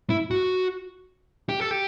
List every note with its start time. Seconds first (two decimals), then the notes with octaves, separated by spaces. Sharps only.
0.10 E4
0.31 F#4
1.49 G4
1.60 A4
1.71 G4